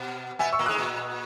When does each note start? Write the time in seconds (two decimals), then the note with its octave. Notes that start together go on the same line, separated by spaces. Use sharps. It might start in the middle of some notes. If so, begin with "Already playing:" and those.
Already playing: B2 B3
0.39 B2 B3 E5 G#5
0.53 C#6 E6
0.59 A#2 A#3
0.66 G#2 G#3 D#6 F#6
0.78 A#2